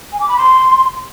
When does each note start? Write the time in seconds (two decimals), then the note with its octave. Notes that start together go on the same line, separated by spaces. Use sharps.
0.12 G#5
0.20 D6
0.29 B5
0.37 C6